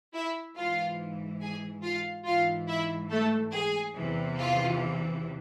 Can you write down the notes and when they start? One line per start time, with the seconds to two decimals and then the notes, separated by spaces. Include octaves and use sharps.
0.14 E4 E5
0.57 G#2 E3 F4 F5
1.41 G#4 G#5
1.83 F4 F5
2.26 G#2 E3 F4 F5
2.68 E4 E5
3.10 A3 A4
3.52 G#4
3.95 E2 C3 E3
4.38 F4